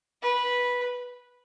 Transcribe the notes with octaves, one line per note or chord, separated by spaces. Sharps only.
B4